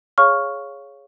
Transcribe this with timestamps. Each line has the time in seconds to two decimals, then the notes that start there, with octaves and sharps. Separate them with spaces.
0.18 G#4 C#5 F5 C#6 F6